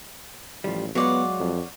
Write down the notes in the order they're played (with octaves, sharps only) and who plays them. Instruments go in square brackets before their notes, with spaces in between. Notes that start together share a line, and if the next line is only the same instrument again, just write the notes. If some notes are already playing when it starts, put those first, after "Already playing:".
[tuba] A1 [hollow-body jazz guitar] F3 G3
[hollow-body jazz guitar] F#3 G#3 F4 [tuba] B3 [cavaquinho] C#5 D5 F#5
[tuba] F2